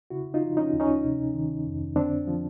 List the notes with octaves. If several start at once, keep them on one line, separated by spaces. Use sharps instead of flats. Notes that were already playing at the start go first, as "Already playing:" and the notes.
C#3 E4 F#4
D#4 F4
F3
C#4 D#4
D2
C#4 D#4
C3
D#3
F2
D3 C4 D4
F3